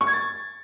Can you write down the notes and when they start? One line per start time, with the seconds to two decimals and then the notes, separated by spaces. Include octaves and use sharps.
0.01 C#6
0.07 G#6
0.13 A6